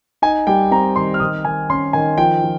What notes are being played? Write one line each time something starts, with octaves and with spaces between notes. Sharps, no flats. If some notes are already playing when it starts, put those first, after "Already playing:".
D#4 G#5
G3 G5
C4 A#5
D#3 C6
F6
D#3 D#6
D#3 G#5
C#4 C6
D#3 G#5
F3 G5
F3